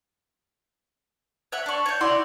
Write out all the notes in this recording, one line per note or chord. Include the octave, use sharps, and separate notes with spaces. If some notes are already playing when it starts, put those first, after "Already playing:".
C#5 E5 F#5
D4 C#6
C#5 G6
E4 F#4 D5 C6